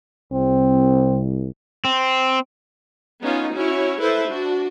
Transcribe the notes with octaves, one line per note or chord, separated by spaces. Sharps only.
C2 C4
C4
B3 C#4 D#4 F4
C#4 E4 F#4 C#5
E4 A4 B4 C5 E5
D4 F#4